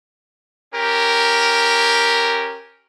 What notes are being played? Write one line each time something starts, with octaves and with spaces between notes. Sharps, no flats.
C#4 G4 A#4